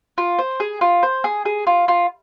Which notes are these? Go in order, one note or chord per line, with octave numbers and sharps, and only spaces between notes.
F4
C5
G#4
F4
C5
G#4
G#4
F4
F4